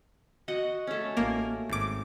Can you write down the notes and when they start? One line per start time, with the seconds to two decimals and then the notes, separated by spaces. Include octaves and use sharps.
0.48 F#4 D#5 F#5
0.87 A3 C#4
1.17 A1 A#3
1.70 G#1 D6